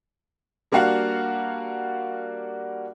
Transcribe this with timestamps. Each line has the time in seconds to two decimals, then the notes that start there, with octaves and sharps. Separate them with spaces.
0.72 G3 A#3 D4 F#4 F5 F#5